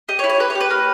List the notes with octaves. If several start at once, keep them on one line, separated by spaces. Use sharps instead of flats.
G4 D#5
C#5
E4
C#5
G4 B4
C#5
G4
B4
A#3